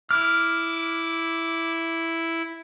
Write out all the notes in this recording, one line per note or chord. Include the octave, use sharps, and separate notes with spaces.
E4 D6 F6